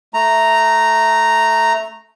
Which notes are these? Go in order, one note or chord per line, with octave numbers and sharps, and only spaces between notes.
A3 A#5